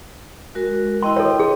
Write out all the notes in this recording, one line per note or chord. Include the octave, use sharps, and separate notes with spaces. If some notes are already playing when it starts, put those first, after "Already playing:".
G#3 F#4 A#4
E4 D#5 G5 C6
A4 C#5
G#4